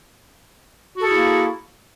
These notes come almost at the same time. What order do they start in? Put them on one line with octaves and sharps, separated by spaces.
F#4 A4 G#4 E4 A#3